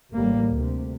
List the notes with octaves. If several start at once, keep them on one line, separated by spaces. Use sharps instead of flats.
A1 A2 G3 A#3
D2 C3